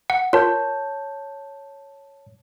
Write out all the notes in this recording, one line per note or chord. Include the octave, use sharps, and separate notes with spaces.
F#5
F4 A#4 C#5 A5 G6